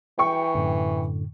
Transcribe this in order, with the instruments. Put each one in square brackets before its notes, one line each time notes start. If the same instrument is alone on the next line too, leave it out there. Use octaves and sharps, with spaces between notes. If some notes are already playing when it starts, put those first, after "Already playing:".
[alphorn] E3 [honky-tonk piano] G5 C#6
[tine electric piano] F#2 A2 D3